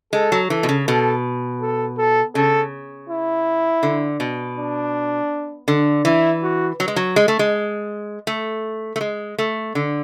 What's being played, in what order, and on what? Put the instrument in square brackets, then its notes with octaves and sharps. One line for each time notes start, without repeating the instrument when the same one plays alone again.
[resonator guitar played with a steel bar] G#3 [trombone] A4
[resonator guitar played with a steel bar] F#3
[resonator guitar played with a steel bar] E3 [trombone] A4
[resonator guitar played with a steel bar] B2
C#3
[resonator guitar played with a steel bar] B2 [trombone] A4
[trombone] A4
A4
[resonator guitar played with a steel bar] C#3 [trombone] A4
[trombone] E4
[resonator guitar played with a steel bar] D3
B2
[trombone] D4
[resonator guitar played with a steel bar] D3
[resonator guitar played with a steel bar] E3 [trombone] E4
[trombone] F#4
[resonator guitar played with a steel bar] F#3
G#3
F#3
G#3
A3
G#3
A3
A3
G#3
A3
D3